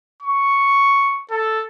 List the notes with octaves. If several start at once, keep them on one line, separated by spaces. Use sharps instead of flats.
C#6
A4